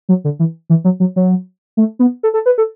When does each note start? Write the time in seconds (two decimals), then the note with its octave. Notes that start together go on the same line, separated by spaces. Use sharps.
0.09 F#3
0.24 D3
0.39 E3
0.70 E3
0.84 F#3
1.00 F#3
1.16 F#3
1.77 A3
1.99 B3
2.23 A4
2.34 A4
2.46 B4
2.58 A4